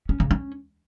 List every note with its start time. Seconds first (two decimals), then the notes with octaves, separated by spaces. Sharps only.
0.09 C#4
0.20 C#3
0.31 C#4